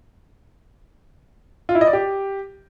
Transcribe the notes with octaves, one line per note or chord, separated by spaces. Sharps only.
F4
E4
D#5
D5
G4